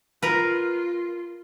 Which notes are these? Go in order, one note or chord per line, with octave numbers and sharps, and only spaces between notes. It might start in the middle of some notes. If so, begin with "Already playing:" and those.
F4 A#4 B4